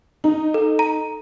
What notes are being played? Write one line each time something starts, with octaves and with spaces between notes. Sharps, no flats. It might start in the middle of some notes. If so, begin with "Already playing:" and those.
D#4
A4
A#5